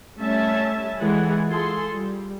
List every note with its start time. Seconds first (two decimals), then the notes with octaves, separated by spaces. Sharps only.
0.17 G3 A3 C#4 E5 A5
0.97 E3 G#3 A4 F#5 G#5
1.46 F4 G#4 A4 C6
1.92 G3